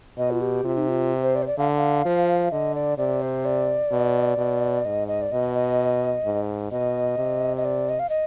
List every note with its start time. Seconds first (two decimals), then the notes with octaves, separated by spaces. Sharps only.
0.17 B2 D#5
0.31 F4
0.41 G4
0.64 C3 F4
0.77 D#4
0.88 F4
1.23 C5
1.35 D5
1.42 C5
1.47 D5
1.58 D3 F5
1.77 F5
2.05 F3
2.52 D3 D#5
2.75 D5
2.98 C3 D5
3.22 C5
3.45 D5
3.91 B2
4.38 B2
4.85 G#2 D#5
5.08 D#5
5.22 D5
5.32 B2 D#5
5.55 D#5
6.25 G#2
6.71 B2 D#5
7.18 C3
7.57 D#5
7.65 D5
7.89 D#5
7.99 F5
8.09 D#5